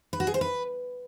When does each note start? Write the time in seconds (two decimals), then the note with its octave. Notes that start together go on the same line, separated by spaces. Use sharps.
0.13 B4
0.20 F#4
0.27 G#4
0.34 C5
0.41 B4